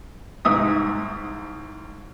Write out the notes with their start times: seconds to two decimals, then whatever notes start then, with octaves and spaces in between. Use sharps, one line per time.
0.45 C2 G#2 E5 D#6